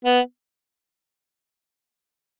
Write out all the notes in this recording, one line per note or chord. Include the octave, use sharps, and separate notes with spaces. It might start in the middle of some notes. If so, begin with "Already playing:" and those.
B3